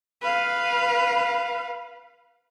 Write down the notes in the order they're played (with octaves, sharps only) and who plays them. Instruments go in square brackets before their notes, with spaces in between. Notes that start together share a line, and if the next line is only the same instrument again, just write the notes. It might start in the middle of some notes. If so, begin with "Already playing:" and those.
[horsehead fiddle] B4 F5